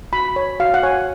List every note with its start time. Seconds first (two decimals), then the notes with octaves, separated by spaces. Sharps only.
0.13 F#4 B5
0.36 C#5
0.60 F#4 F5
0.74 F#5
0.83 C#5 G#5